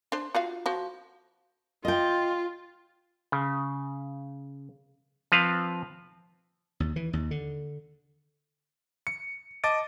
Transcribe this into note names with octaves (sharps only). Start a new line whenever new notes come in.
D4 C5
F4 F#4 F5
F3 F#4
F4 D#5 G5
C#3
F3 C4 B4 F5
D#2
E3
D#2
D3
C#7
D#5 A5 D6 A6 D7